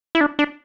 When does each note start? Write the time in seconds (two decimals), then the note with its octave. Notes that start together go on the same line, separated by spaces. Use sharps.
0.15 E4
0.21 D4
0.39 D4